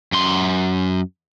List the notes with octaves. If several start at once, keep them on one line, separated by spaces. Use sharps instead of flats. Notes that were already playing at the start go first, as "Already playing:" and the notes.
F#2 C6